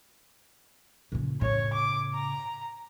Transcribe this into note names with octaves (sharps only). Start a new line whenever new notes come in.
A#2 C#3
A2 C#3 C#5
D6
A#5